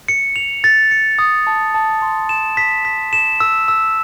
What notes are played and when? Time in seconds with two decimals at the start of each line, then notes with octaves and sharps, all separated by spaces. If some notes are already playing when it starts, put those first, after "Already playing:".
0.08 C#7
0.36 F7
0.64 A6
0.91 C#7
1.19 D#6
1.47 A5
1.74 A5
2.02 C6
2.29 E7
2.57 B6
2.85 B6
3.13 E7
3.40 E6
3.68 E6